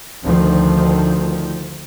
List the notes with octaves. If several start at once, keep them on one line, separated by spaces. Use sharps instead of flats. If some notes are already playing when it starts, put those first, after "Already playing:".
D2 D#3 F3